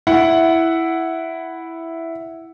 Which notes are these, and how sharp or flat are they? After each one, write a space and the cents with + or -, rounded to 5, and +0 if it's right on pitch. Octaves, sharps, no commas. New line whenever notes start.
E4 +0 F#5 +0